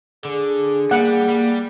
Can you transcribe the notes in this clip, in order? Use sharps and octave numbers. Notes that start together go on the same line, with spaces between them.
D3 G#4
G3 A#3 F#5
G3